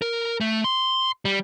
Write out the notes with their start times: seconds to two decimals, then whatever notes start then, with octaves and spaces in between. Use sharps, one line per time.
0.02 A#4
0.41 A3
0.64 C6
1.25 G3